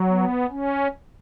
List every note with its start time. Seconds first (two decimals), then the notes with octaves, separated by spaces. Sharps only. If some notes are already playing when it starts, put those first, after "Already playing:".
Already playing: F#3
0.08 B3
0.50 C#4